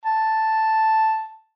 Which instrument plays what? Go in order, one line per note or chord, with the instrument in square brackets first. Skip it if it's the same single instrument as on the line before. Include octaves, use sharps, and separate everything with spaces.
[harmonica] A5